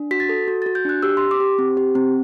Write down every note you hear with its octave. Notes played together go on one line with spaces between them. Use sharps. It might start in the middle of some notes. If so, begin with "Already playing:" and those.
Already playing: D4
F#4 B6
A6
A4
F#4
F#4 A6
G6
D4 F#6
G4 E6
G4 C6
D6
G4
C4
G4
C4